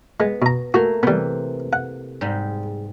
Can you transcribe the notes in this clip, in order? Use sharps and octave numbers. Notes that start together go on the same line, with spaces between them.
G#3 B3
B2 A#5
A3 A#3 F#4
C3 E3 G3 B3
F#5
G#2 G3 G#3